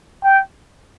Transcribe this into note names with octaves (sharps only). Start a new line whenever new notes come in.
G5